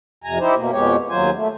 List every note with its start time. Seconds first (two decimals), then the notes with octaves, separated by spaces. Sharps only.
0.24 F2 C3 G#5 A#5
0.40 D#4 E4 G4 C5
0.56 B2 A#3
0.72 F2 B2 G#3 G4 C#5
1.10 D#2 F#3 F4 C5 G#5
1.35 A3